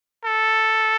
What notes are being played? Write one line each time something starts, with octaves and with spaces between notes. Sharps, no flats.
A4